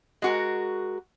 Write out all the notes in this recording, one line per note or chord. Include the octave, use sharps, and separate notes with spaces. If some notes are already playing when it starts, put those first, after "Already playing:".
G#3 F#4 A#4